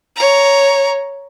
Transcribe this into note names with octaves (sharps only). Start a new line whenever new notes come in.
C#5 A#5